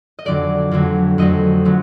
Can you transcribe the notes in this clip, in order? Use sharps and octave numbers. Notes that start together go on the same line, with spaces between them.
D#5
F2 D3 F#3 A3 D5
F2 D3 F#3 A3
F2 D3 F#3 A3 D#5
D3 F#3 A3